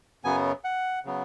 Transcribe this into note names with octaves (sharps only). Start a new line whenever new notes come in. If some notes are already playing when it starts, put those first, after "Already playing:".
F#2 C#3 F#3 B3 G#5
F#5
C#3 F#3 B3